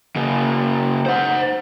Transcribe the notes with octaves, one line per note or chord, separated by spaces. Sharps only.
C#3 A#3
C5 F#5